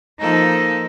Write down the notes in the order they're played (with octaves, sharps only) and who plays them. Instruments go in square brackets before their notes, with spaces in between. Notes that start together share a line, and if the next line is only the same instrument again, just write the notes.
[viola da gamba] F3 A#3 A4 [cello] D#4